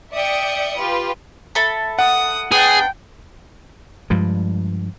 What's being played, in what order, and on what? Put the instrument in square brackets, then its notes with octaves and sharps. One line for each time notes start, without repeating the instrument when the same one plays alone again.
[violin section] D5 E5 G5 D#6 C#7
F4 G4 B4
[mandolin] A4 E5 B5
[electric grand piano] F#5 [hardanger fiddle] D#6
[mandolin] B3 D4 [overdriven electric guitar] G#4 [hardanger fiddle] G5
[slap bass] G2 F3 G3 G#3